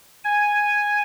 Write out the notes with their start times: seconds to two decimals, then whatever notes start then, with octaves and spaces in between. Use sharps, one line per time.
0.24 G#5